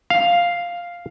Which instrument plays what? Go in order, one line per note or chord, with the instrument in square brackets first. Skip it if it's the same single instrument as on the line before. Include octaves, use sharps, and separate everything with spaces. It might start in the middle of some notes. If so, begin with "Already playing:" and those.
[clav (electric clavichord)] F5